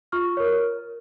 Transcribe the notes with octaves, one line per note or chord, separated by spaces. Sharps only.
F4 C#6 F6
A#4 C#5